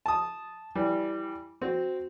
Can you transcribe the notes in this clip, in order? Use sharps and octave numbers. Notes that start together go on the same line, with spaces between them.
A5 D#6
E3 G3
C4 F#4